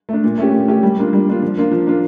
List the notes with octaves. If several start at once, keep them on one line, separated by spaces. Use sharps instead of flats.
A3 D4
A#2
A3 C#4 G4
A#2
A3 C#4 G4
G3
A#3 D4 F4
G3
A#3 D4 F4
F3
A#3 D4 F4
F3
A#3 D4 F4